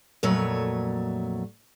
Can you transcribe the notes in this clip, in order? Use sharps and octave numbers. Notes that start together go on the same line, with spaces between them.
F2 A#2 F#3 A3 C#5